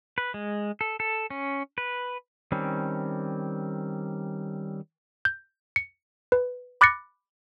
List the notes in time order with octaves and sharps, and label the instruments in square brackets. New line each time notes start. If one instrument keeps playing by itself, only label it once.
[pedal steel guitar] B4
G#3
A4
A4
C#4
B4
[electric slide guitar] D#3 G3 C4 C#4
[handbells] G6
C#7
B4
B5 D6 F#6 A6 A#6 C#7